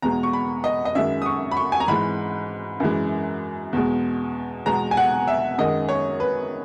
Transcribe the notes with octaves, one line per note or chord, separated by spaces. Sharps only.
E2 B2 G#3 A#5
C#6
B5
D#5
D#5
F#2 D#3 G#3 E5
D#6
C#6
B5
C#6
G#5
A#5
G#2 E3 G#3 B5
F#2 E3 G#3
E2 B2 G#3
E2 B2 G#3 A#5
G#5
F#5
E5
F#2 D#3 G#3 D#5
C#5
B4